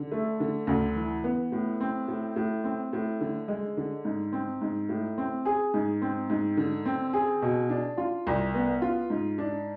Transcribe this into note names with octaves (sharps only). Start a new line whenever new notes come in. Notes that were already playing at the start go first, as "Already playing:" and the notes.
Already playing: D3
A3
D3
D2
E3
B3
A2
C4
A2
A2
C4
A2
D3
G#3
D3
G#2
C4
G#2
A2
C4
G#4
G#2
C4
G#2
D3
C4
G#4
B2
D4
F4
C2
B3
F4
G#2
D4